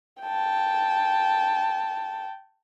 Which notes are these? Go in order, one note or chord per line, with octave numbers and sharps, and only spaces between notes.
G5 A5